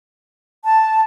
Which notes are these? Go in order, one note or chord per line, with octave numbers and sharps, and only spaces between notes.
A5